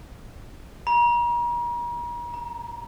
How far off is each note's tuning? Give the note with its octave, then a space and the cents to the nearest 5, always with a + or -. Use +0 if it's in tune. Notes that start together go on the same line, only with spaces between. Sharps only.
A#5 +40
A#5 +0